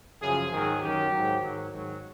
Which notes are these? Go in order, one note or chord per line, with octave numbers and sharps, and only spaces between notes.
F#2 C#3 F3 G#4
G#2 D#3 F#3 G#4
F#2 D#3 F#3 G4
G#2 D#3 F#3
G#2 D#3 F#3
G#2 D#3 F#3